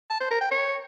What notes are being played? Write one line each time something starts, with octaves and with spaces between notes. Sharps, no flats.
A5
C5
A#4
G5
C#5